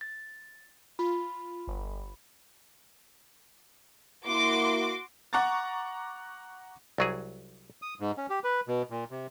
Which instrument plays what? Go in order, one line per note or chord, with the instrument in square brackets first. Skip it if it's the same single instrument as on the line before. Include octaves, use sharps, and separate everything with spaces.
[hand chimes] A6
[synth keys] F4 [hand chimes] B5
[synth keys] G1
[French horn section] A#3 E4 [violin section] F#4 C6 D6
[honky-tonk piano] F#5 A#5 C#6 D6 A6
[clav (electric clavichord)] C2 F#3 G#4
[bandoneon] D#6
G#2
C#4
G4
B4
B2
A#2
C3